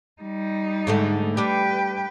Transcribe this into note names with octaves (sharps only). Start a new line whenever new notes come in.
G3 D#4
G#2 D3 A3
G3 D4 B4 G5